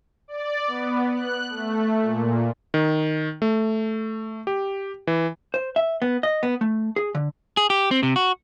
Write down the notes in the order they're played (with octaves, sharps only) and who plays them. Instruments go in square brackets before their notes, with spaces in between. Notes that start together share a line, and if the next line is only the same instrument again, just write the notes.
[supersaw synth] D5
B3
F#6
A3
A#2
[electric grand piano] D#3
A3
G4
E3
[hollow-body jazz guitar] C5
E5
B3
D#5
B3
A3
G#4
D3
[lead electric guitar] G#4
G4
C4
C3
F#4